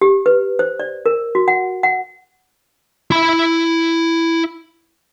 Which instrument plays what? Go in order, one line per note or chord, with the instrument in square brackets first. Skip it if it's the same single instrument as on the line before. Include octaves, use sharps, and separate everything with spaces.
[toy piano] G4
B4
C5
D5
A#4
F#4
F#5
F#5
[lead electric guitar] E4 B5